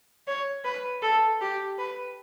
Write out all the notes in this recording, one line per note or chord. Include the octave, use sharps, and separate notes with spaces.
C#5
B4
A4
G4
B4